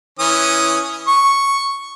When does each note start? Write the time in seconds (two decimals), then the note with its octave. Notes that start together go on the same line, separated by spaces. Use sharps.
0.19 E3 C#4 D#6
1.07 C#6